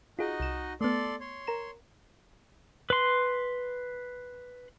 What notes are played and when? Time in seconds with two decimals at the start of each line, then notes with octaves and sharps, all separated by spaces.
0.19 D#4 F4 F#4 G#4 D#5
0.40 C2 E7
0.81 A3 B3 A4 D5 C6
1.20 C#5 C6
1.47 A#4 A#5 E7
2.90 B4 C6